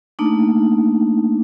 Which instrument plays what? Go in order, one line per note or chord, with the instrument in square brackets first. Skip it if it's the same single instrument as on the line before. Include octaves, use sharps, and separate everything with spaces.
[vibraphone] A3 A#3 D4 D#4